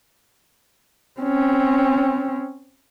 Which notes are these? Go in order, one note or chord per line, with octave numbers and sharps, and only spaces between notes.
C4 C#4